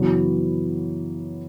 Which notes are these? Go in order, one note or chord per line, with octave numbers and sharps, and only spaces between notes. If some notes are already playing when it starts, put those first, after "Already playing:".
Already playing: F#2 C#3 E3 B3 F#4